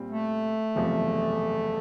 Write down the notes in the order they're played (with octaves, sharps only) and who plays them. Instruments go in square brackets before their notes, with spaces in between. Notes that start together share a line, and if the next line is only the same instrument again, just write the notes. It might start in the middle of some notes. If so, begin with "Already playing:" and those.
Already playing: [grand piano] A#2 G3 C4
[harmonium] A3
[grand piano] F#1 E2 C3 F3